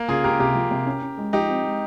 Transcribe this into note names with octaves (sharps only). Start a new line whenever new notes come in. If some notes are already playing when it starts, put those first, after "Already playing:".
Already playing: A#3
C#3 F4 G#4
C#2 G4 A#4
C3 G4 A#4
F3
C3
C#4
C#4
G#3
F3 D#4 G4
C4
G#3